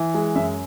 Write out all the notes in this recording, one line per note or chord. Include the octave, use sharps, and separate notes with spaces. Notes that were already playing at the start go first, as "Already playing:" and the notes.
Already playing: E3
G#3
F#2 E5